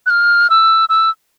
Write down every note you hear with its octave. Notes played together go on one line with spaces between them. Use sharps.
F#6
F6
E6
E6